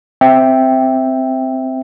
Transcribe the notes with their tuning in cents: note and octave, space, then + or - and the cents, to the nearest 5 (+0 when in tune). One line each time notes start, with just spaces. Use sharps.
C4 -5 E5 +0 G5 +0